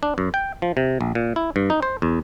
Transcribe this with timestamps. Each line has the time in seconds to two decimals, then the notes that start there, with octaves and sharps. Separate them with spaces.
0.03 D4
0.18 F#2
0.34 G5
0.62 F3
0.77 C3
1.01 A#1
1.15 A#2
1.36 E4
1.56 G2
1.70 D#4
1.82 C5
2.02 E2